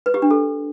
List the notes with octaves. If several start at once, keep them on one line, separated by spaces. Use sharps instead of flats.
B4
G4
D4
A4